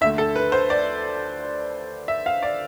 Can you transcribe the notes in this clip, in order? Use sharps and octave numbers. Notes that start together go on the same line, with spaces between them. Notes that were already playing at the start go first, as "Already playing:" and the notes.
D2 D3 A3 E5
A4
B4
C5
D5
E5
F5
D5